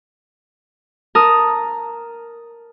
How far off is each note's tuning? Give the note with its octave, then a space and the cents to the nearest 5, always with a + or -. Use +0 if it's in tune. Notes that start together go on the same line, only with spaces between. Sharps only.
A#4 +0 A5 +0 D#6 +0